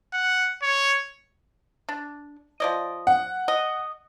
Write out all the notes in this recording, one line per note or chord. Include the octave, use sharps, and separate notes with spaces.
F#5
C#5
D4
F3 D5 D#5
F#5
D#5